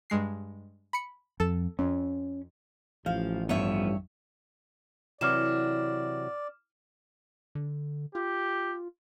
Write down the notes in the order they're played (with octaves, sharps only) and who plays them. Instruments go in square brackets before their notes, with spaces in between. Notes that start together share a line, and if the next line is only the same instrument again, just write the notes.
[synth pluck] G2 G#3 C7
B5 C#7
[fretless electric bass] F2 [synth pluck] A4 E7
[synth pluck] F2 [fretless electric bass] C#4
[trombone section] A1 [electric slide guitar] F3 [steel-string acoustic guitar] F5
[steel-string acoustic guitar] G2 C#5 E5 [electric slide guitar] F3 B3
[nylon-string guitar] C3 E3 F#3 [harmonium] D5 [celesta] D6 F6 E7
[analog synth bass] D3
[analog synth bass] F4 [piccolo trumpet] G4